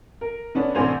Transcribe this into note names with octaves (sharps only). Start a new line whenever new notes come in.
A#4
D3 B3 C#4 D4
A1 C3 D4 C5 G#5 F7